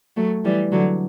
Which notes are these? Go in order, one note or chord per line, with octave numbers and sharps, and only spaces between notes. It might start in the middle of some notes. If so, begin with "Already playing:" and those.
F#3 A3
E3 G3
D3 F#3